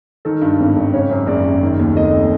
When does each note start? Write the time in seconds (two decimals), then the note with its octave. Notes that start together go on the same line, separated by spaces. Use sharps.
0.25 D#3 A4
0.41 G2
0.60 G#1
0.76 G#1
0.94 C#3 C#5
1.10 F#2
1.27 F#1 D5
1.44 F#1
1.62 D#3
1.79 D#2
1.96 F1 D#5